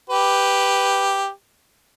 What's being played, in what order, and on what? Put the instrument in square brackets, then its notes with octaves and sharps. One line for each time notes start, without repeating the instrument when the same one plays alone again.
[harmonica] G4 B4